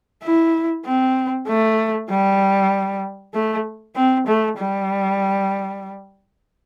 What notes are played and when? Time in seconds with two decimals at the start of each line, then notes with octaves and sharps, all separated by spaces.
0.23 E4
0.86 C4
1.47 A3
2.10 G3
3.34 A3
3.96 C4
4.27 A3
4.59 G3